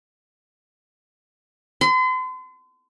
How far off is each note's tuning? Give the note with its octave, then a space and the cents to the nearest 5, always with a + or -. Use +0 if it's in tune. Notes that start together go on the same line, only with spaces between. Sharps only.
C6 -40